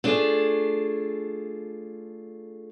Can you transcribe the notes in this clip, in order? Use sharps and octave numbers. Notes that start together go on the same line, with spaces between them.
A3 D4 F4 G#4